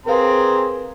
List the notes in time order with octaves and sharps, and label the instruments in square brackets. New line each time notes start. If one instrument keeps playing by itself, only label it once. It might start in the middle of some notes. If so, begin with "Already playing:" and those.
[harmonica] C4 A#5 C6 [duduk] G#4 [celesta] A#4 B4 F5